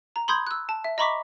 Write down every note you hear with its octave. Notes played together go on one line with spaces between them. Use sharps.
A#5
B5 C6 D#6 G6 G#6
E6 F#6
A5
E5
D#5 A#5 B5 C#6 D6 B6